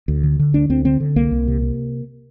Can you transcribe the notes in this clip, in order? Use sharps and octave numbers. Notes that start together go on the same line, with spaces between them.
D2
D3
D3
D2 D4
D2 C4
D3 C4
D3
C2 A#3
C2
C3
C3